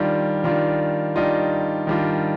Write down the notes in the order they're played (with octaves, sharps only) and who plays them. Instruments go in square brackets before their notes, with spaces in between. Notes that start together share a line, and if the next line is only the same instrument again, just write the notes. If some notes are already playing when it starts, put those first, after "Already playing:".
Already playing: [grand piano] D#3 G3 D4 F4
D#3 G3 D4 F4
D#3 G3 D4 F4 D#5
D#3 G3 D4 F4